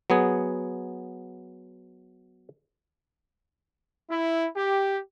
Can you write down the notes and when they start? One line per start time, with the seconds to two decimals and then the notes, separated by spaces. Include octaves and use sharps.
0.10 F#3 B3 G#4
4.10 E4
4.56 G4